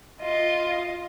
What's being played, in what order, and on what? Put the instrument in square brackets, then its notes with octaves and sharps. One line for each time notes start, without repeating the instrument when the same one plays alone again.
[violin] F4 D#5